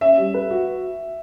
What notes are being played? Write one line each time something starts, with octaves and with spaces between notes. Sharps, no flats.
C#4 E5
G3
B4
F#4